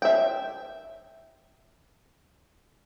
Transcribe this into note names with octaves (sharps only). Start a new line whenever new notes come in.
E5 G5